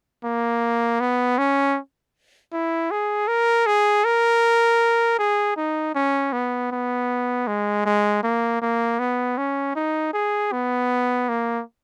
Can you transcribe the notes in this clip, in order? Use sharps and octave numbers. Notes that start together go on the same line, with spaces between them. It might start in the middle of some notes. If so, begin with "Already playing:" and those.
A#3
B3
C#4
E4
G#4
A#4
G#4
A#4
G#4
D#4
C#4
B3
B3
G#3
G#3
A#3
A#3
B3
C#4
D#4
G#4
B3
A#3